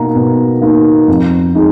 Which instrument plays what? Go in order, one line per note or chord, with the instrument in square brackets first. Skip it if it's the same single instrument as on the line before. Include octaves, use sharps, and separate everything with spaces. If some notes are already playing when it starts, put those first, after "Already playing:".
Already playing: [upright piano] B2 A#3 D#4 A#5
B2
A#3 D#4
F2
G#3 D#4